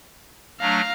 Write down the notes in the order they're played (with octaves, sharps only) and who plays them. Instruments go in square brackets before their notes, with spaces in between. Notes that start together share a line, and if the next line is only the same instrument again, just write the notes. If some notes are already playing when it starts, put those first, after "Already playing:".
[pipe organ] F#3 A3 D4 [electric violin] F5 A#5